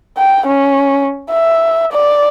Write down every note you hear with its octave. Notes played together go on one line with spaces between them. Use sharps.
G5
C#4
E5
D5